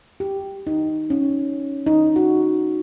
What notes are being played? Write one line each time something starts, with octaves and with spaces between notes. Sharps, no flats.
G4
D#4
C#4
D#4
F#4